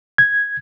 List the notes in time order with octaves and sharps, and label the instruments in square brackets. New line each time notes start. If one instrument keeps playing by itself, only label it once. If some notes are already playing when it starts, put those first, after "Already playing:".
[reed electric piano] G#6